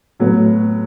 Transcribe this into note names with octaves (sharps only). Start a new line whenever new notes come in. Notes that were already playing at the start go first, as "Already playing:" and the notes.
A2 F#3 B3